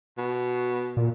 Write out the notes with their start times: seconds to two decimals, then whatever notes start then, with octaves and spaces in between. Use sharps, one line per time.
0.18 B2
0.97 A#2